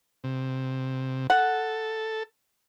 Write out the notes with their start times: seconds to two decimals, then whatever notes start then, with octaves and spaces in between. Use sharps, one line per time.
0.24 C3
1.30 A4 F#5